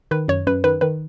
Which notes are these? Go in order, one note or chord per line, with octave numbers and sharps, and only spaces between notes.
D#3 B4
F#2 C#5
F#2 B4
D#3 B4
D#3 B4